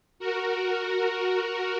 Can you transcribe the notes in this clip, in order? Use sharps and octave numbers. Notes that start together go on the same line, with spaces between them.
F#4 A#4